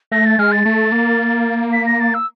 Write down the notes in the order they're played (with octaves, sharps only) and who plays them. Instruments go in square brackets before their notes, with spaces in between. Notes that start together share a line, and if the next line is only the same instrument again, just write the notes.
[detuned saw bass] A3 [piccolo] A#6
[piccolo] A6
[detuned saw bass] G#3 [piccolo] F6
[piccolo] A6
[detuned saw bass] A3
A#3
[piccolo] B6
A#6
A6
E6